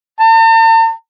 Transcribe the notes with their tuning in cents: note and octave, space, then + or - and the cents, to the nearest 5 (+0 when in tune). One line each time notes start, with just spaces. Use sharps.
A5 +45